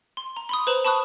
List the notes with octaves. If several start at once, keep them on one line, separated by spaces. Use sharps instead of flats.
C6
A#5
B5 C6 D#6
B4 C5 A#5 E7 F#7
A5 B5 C#6 D#6 F#6